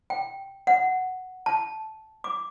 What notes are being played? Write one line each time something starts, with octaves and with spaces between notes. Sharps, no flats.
G5
F#5
A5
D6